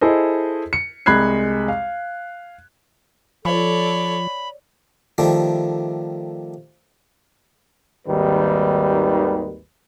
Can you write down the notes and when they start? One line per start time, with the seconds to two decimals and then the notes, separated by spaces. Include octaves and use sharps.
0.01 E4 G#4 A4 C5 D#5
0.73 C#7
1.06 C2 G#3 B5 F#6 G#6 C7
1.68 F5
3.45 F3 A4 C#5 D5 B5
5.18 D#3 F3 G3 A3
8.08 G#1 D#2 D#3 G3 B4